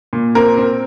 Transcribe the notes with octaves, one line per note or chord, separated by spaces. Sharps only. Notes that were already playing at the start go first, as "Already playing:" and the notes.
A#2
C4 A#4
C4